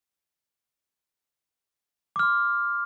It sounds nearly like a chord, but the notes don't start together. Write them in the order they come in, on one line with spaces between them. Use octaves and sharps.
D6 F6 C6